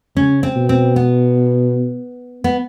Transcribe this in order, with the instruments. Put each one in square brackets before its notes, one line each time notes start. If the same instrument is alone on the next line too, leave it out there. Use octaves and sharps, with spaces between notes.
[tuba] C#3 [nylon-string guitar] C#4
[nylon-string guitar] C4
[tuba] B2
[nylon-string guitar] C4
B3
B3